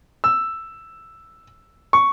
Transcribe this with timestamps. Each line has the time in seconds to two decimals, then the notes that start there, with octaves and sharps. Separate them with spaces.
0.24 E6
1.93 C#6